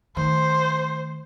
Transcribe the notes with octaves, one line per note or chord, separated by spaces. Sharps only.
D#3 A3 C5